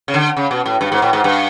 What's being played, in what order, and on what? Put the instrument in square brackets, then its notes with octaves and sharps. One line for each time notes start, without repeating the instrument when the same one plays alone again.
[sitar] C#3
D3
C#3
B2
A2
G2
G#2
A2
G#2
G2